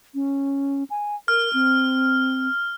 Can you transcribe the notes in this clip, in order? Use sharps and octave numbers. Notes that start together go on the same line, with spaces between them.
C#4
G#5
A#4 F6
C4